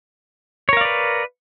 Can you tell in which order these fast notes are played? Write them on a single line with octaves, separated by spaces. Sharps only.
C#5 A#4 F5 D5 B4